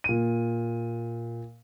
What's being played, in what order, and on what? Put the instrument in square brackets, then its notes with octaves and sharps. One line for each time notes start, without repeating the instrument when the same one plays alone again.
[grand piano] A#2 D#7